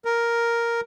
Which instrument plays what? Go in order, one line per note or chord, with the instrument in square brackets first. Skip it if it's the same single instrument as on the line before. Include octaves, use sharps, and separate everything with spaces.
[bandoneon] A#4